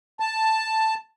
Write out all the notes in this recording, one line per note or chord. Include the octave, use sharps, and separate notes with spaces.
A5